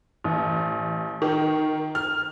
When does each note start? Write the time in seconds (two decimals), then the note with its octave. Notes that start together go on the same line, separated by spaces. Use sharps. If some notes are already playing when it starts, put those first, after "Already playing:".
0.24 A1
1.22 D#3
1.95 F6